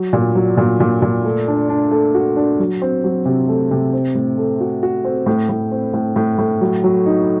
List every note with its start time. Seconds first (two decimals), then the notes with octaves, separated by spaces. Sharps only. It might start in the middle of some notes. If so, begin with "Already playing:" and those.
Already playing: F#3
0.13 A#2
0.35 F#3
0.57 A#2
0.80 A#2
1.02 A#2
1.25 A3
1.48 D4
1.69 D4
1.91 A3
2.15 F#4
2.36 D4
2.59 F#3
2.82 C4
3.04 F#3
3.25 C3
3.48 A3
3.71 C3
3.93 C4
4.15 A2
4.38 A3
4.61 F#4
4.83 F#4
5.05 C4
5.26 A2
5.49 A2
5.72 C4
5.94 A2
6.16 A2
6.38 A2
6.61 F#3
6.84 F#3
7.06 D#4